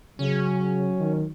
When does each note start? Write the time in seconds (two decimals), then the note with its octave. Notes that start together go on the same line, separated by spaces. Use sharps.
0.19 C#3 F#3 C#4
0.99 D#3